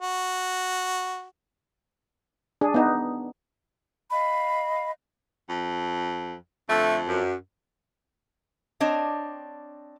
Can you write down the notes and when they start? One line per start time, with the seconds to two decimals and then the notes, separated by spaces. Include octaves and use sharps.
0.01 F#4
2.61 D4 G#4
2.74 B3 D#4
4.11 D#5 F5 B5
5.49 F2
6.69 F2 D3 A3
7.08 F#2
8.80 C4 D4 C#5 D#5